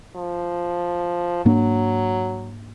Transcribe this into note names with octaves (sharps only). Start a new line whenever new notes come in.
F3
G#2 F#3 A#3 D4